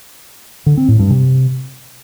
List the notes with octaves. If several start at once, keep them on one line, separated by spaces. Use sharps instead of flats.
D3
C4
A2
G2
C3